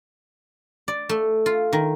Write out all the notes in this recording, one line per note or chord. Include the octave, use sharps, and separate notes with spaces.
D5
A3
F4
D#3